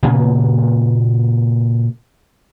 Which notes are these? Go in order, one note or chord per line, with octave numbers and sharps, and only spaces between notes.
A#2 C#3 A#3 B3